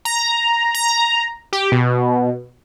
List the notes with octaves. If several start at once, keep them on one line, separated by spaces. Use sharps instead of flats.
A#5
A#5
G4
B2